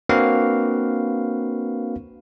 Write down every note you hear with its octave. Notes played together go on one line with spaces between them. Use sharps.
A#3 C4 D4 F#4 B4 F5